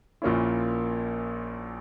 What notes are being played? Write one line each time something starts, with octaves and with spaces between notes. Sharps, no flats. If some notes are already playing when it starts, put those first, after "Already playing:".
A#1 A#2 A#3 C#4 E4